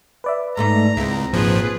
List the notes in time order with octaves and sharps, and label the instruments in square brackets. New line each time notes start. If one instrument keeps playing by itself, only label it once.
[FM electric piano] B4 D5 E5
[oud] G#2 A3 D#4 [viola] A#5
[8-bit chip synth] C#2 [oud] C4 E4
[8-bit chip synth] G#1 F3 [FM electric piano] A#2 [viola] G#4 B4